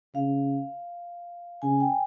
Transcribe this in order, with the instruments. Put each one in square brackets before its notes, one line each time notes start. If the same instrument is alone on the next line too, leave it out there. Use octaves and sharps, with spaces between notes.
[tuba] C#3 [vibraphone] F5
[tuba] C#3 [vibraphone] G#5
[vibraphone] G5